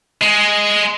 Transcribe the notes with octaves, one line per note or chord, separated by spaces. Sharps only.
G#3